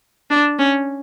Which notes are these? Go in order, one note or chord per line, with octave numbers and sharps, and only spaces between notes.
D4
C#4